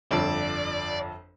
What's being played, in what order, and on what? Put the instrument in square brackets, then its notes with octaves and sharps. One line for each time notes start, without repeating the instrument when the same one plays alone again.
[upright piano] G1 F2 [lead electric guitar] D5